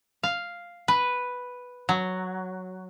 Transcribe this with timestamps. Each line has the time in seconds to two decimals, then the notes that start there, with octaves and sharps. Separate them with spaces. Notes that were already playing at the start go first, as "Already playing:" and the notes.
0.23 F5
0.88 B4
1.89 F#3